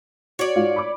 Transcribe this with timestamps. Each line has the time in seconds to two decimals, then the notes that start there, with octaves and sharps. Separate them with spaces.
0.39 F#4 C#5 D5
0.56 G#2 F4 F#4
0.76 B5 D6